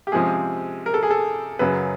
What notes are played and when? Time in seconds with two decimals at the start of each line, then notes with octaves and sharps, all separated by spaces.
0.07 G4
0.12 C3 F3 G#3 C#4 G#4
0.86 A#4
0.94 A4
1.03 G#4
1.11 A4
1.59 F#2 C#3 F#3 B4